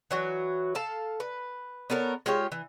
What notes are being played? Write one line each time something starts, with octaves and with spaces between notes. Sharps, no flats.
E3 F#3 F#4
A4 F5 A5
B4
B3 A4 A#4 C#5
G#3 F4 G4 C#5
E3